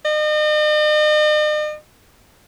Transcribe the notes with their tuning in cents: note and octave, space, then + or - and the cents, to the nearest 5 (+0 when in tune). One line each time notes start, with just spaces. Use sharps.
D#5 -45